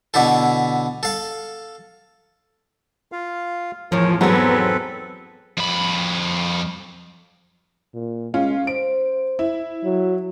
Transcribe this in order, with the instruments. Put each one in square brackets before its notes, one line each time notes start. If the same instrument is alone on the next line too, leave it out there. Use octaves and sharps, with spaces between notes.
[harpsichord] B2 D3 E4 A4
A4 F5
[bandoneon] F4 F5
[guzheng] E2 A2 [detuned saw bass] F3 [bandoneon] A#4 C#5
[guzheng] G#2 G#3 [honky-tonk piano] F#3 [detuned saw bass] B3 [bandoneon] C4 A4 B4
[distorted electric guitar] F2 B5
[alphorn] A#2
[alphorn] G#3 [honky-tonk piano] C#4 F4
[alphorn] C5 [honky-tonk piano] D7
[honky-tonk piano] E4
[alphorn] F#3